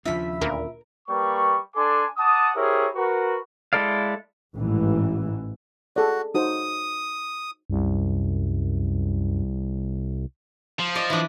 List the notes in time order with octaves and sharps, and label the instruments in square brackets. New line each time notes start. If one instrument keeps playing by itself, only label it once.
[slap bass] D#2 C#4 D4 [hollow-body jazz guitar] C#3 F3 F4 [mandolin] E5 B5
[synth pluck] D2 A#2 A#3 [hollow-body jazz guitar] A#4 A#5
[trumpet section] G3 A#3 B4 C#6
D4 A4 G#5 C6 D6
F#5 A5 D6 D#6
E4 G4 G#4 A#4 C5 C#5
F#4 A#4 B4
[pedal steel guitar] G#3 E4 A4 D5 F5
[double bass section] A1 G#2 E3
[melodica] F#4 [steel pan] G#4 A4 D5
[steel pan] D#4 F#4 C5 [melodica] D#6
[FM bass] C2 [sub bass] F#2
[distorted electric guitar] F3
[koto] D5 D#5
E3 D4